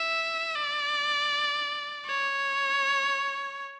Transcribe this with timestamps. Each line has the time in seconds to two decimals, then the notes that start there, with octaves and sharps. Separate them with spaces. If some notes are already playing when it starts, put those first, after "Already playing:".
Already playing: E5
0.55 D5
2.06 C#5